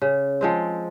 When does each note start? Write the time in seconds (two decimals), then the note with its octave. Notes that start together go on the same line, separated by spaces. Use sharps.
0.02 C#3
0.41 F3 G#3 C4